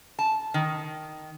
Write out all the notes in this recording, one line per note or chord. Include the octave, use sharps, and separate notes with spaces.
A5
D#3